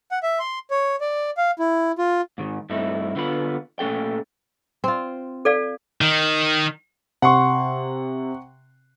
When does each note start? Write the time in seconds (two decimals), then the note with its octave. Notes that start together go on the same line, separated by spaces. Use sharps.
0.11 F#5
0.23 E5
0.39 C6
0.71 C#5
1.01 D5
1.37 F5
1.59 E4
1.98 F4
2.38 G#2 D#3
2.70 G2 A3 C4 D#4 E4
3.15 D3 B3 F4 B5
3.79 A#2 A3 C#4 A4 G5
4.84 C4 F4
5.45 A4 D5 F5
6.01 D#3
7.22 C3 F#5 C6 C#6